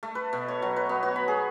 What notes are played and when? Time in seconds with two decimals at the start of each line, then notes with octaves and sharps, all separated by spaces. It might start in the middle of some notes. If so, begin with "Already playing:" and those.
0.03 A3
0.15 B4
0.33 B2
0.48 C#5
0.62 F#3
0.76 B4
0.89 B3
1.03 F#4
1.16 B5
1.28 G#4